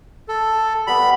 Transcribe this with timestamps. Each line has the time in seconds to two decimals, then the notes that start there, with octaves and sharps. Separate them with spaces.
0.28 A4
0.87 G3 B3 B5